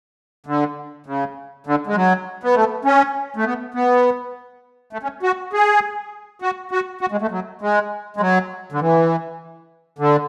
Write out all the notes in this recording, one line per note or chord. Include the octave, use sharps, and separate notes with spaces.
D3
C#3
D3
G#3
F#3
B3
A3
C#4
A3
B3
B3
A3
C#4
F#4
G#4
F#4
F#4
F#4
G#3
A3
F#3
G#3
G#3
F#3
D3
E3
D3